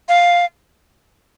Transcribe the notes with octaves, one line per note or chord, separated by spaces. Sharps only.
F5